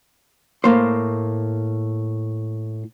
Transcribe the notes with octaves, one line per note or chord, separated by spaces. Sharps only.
A2 A#3 C5